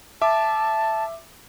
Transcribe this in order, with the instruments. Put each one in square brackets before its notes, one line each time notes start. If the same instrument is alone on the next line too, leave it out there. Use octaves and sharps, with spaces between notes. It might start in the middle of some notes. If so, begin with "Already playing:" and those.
[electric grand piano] E5 D6 [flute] A5